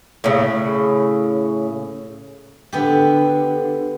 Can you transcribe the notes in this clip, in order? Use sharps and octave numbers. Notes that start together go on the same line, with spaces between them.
A2 C#3
D3 B3 G4